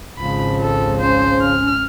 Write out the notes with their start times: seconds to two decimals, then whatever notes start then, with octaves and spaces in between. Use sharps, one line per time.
0.18 G#1 C#2 C#3 F3 B5
0.61 A4
1.01 C#4 C5
1.42 F6